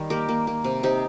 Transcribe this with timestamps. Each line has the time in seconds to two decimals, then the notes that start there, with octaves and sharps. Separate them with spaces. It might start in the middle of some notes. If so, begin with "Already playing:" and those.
Already playing: D#3 G3
0.10 A#3 G4 A#4
0.29 A#3
0.47 A#3
0.64 C3
0.83 C3 D#4 G4